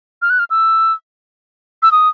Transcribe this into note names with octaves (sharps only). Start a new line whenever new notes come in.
F6
F#6
F6
E6
E6
D#6